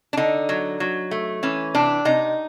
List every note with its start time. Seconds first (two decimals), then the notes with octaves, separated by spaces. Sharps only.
0.13 D4
0.17 D3 D#4
0.49 F#3
0.80 F#3
1.11 A3
1.43 E3 C#4
1.75 C3 D4
2.05 C3 D#4